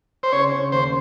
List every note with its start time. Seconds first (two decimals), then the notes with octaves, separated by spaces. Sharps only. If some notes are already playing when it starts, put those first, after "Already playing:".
0.23 C5
0.32 C#3 C#5
0.52 C#3
0.72 D#2 C5